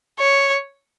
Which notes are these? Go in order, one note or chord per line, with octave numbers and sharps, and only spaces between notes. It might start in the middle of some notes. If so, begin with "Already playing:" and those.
C#5